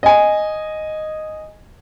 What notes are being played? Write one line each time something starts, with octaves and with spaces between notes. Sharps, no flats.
D#5 G#5